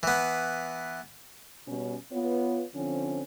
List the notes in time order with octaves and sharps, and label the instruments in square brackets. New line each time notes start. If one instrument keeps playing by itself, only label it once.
[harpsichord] E3 B3
[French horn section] B2 G3 C#4
B3 F4 B4 C#5
D3 F3 C4 C#4